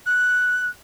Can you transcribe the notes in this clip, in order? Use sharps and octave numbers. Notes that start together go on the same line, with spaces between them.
F#6